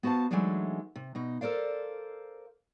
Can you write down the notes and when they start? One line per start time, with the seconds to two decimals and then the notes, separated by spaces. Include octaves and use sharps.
0.03 B3 F#4 C5 F5 A5
0.31 E3 F#3 G#3 A3 D4 D#4
0.96 C3
1.15 B2 D#4
1.41 A4 A#4 C5 D5 F5